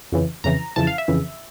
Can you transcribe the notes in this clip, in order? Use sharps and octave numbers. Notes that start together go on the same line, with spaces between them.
F2 C#3 E3
F2 C#3 E3 A#5
F2 C#3 E3 A5
F5
E5
F2 C#3 E3